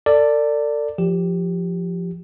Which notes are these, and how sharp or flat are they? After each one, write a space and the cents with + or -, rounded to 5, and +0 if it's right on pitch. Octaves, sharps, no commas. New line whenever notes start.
A4 +40 D5 +0
F3 +0 G4 +0